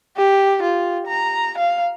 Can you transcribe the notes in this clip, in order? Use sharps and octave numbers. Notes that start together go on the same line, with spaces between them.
G4
F4
A#5
F5